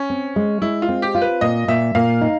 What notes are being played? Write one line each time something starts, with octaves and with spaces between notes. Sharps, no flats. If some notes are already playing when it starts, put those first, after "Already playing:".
Already playing: C#4
C4
G#3
G#3 E4
F4
C4
G4
F4
B4
A#2 D#5
A#2 E5
A#2 F5
D#4